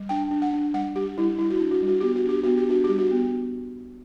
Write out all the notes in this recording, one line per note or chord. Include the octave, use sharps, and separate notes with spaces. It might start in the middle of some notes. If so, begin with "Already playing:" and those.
Already playing: G3
D4 G5
D4
F#5
D4
G3 F#5
G3 G4
G3 E4
G3 E4
F#4
E4
D4
F#4
G3
F#4
B3 G4
F#4
D4 G4
B3 F#4
G4
D4 F#4
G3 G4
F#4
B3